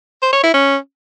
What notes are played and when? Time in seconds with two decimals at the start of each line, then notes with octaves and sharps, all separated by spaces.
0.22 C5
0.33 C#5
0.43 E4
0.54 C#4